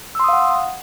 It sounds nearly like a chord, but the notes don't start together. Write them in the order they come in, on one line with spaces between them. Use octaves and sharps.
E6 C6 D#6 F5 F#5